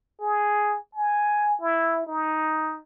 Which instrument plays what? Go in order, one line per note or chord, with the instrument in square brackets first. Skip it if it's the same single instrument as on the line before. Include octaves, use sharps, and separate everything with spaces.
[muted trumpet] G#4
G#5
E4
D#4